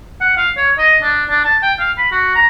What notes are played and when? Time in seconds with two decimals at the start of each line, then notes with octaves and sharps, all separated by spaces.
0.21 F#5
0.37 F5
0.57 C#5
0.78 D#5
1.02 D4
1.30 D4
1.45 A5
1.62 G5
1.79 F5
1.98 B5
2.12 F#4
2.36 A#5